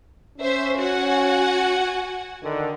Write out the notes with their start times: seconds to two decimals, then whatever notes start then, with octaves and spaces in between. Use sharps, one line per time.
0.39 C#4 C5 E5
0.77 F#4 F#5 G#5
2.43 D3 D#3